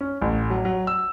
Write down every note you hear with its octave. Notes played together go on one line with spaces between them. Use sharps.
C#4
A1
F#3
F#3
E6